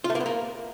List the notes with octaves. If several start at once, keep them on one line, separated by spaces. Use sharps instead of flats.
F4
A3
A#3
B3
A#3